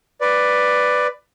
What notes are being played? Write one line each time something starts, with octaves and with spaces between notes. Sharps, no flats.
B4 D5